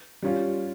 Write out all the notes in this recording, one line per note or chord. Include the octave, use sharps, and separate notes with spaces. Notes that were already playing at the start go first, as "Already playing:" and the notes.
G3 C#4 F4